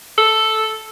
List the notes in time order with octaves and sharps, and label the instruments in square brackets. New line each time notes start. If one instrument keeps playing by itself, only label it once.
[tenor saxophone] A4